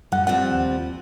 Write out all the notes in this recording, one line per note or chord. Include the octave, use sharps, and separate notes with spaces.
F#2 D3 G3 F#5
F3 G3 C4 F#5
D#2